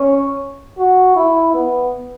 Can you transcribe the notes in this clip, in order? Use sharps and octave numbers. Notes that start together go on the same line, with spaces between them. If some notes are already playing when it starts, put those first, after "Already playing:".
Already playing: C#4
F#4
E4
B3